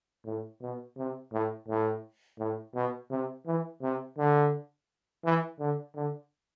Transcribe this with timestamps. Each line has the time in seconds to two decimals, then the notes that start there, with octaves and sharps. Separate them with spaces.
0.25 A2
0.62 B2
0.97 C3
1.33 A2
1.68 A2
2.39 A2
2.75 B2
3.11 C3
3.46 E3
3.82 C3
4.18 D3
5.25 E3
5.60 D3
5.95 D3